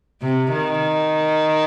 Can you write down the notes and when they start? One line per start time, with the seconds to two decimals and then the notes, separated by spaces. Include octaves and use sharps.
0.22 C3
0.53 D#3